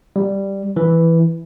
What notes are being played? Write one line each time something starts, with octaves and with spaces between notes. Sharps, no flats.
G3
E3